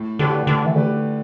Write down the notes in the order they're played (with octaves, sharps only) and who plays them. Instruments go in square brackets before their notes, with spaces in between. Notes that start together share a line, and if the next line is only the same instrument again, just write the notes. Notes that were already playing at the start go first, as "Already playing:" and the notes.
Already playing: [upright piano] A2
[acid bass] D3 [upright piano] A3 G4 B4
[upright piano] A2 [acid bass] D3
[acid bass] E3
[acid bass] D3 [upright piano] A3 G4 B4